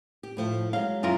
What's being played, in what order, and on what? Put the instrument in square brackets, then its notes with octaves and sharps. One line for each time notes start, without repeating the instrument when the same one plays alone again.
[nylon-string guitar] G4
A2 F3 A3
[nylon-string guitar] F#3 G#3 [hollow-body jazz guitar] F5
[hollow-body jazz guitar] F#2 F4 A#4 [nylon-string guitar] E4 G#4